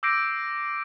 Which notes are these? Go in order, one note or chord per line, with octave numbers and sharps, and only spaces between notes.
D6 E6 G6 A#6 C7 D7